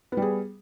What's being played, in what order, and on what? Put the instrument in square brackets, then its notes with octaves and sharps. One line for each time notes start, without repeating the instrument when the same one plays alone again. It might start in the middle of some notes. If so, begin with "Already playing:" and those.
[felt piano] B3
G3
G#4